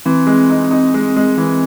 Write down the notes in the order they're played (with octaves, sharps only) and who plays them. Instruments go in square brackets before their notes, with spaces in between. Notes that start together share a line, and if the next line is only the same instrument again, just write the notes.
[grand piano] E3 [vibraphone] C4
[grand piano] G#3
D#4
D#4
G#3
G#3
E3